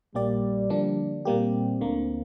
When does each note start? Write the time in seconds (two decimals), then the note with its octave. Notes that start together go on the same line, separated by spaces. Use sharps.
0.14 A#1 A#2 G3 A#3 G4 D5
0.70 D3 F3 A#3 D4
1.25 A#2 G3 A#3 C4 G4
1.81 D2 D3 A#3